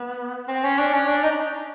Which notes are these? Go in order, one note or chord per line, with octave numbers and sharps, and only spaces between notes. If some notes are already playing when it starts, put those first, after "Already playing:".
Already playing: B3
C4
C#4
D4
C#4
D4
D#4